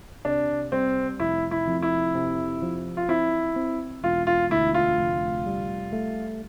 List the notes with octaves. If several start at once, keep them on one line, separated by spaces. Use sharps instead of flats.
C3 D4
G3 C4
F1 E4
E4
F2
E4
C3
F3
F4
C4 E4
C4
E1 F4
F4
D2 E4
F4
F1
G3
A3